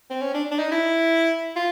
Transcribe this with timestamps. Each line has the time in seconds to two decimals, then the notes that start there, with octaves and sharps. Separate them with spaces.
0.10 C4
0.22 C#4
0.34 D4
0.51 D4
0.59 D#4
0.71 E4
1.56 F4